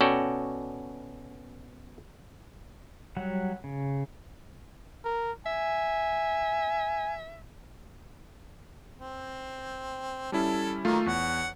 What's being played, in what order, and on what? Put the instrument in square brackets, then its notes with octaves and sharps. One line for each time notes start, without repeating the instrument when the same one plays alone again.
[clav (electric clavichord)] B2 C#4 F#4 A4 D5 G5
[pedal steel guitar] F#3 G3 F#5
C#3
[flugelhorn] A#4
[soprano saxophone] E5 [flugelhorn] G#5
[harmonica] C4
[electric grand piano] G3 C#4 E4 [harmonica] A4
[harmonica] D#3 F#3 A#3 [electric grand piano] A3 F4
[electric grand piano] E2 [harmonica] C#5 F#5